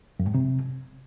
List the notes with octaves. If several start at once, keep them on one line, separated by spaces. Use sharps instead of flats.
F#2
G#2
C3